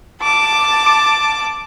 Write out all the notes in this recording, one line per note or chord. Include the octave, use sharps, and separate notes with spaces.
A5 D6